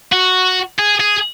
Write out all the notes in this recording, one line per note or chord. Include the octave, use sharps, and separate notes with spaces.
F#4
G#4
G#4